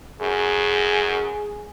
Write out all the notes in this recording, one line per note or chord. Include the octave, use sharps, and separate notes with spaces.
F#2 G#4